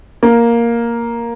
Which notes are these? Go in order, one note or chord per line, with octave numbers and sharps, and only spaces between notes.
A#3